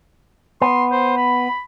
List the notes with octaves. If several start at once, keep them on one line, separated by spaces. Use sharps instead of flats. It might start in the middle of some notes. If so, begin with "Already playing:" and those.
B3 C6
C5
B5